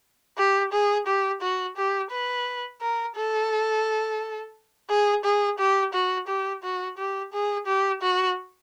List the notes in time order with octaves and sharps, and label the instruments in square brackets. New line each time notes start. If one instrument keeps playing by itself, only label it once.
[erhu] G4
G#4
G4
F#4
G4
B4
A#4
A4
G#4
G#4
G4
F#4
G4
F#4
G4
G#4
G4
F#4